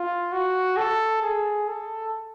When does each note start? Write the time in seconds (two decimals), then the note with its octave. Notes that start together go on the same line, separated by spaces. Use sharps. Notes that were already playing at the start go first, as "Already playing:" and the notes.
Already playing: F4
0.33 F#4
0.77 A4
1.23 G#4
1.67 A4